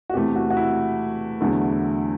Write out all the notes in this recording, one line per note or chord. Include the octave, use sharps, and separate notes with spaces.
F#4
E2 C3 E3 A3 G4
F#4
F#4
E4
E2 D3 F#3 A3